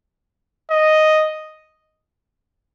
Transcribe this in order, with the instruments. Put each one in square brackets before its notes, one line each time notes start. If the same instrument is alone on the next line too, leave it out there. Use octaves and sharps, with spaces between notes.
[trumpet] D#5